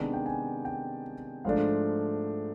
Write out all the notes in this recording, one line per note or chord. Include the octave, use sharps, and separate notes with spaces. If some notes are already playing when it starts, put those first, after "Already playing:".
Already playing: C3 D#3 G#3 B3 D4 A5
G5
G#5
G5
G#2 F3 A3 D4 F5